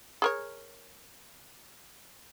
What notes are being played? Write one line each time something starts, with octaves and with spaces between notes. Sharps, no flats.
G#4 A#4 C#5